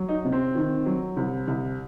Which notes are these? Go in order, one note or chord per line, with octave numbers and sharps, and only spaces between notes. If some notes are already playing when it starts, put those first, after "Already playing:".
Already playing: F#3
D#4
C3
C4
D#3
F#3
C2
C2